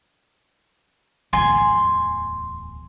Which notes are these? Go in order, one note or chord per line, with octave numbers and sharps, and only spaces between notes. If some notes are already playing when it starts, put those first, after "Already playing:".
D1 E2 G#5 C6